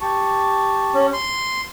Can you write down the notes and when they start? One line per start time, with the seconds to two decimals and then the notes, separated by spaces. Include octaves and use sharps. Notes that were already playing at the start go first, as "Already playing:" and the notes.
0.01 G4 A5 C#6
0.94 C#4
1.13 C6